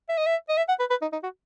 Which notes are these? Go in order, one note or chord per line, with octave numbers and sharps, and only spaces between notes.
E5
D#5
E5
D#5
E5
F#5
B4
B4
D#4
D#4
F#4